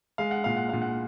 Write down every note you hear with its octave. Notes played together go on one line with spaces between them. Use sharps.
G#3 F5
F#5
A#2 F5
F#5
A#2 F5
F#5